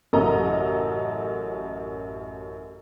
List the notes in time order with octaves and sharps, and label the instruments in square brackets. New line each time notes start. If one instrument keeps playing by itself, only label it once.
[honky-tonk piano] A1 F#2 C#3 A4 D#5 A#5